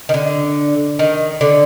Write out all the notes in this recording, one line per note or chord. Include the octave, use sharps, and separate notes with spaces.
D#3
D3
D#3
D3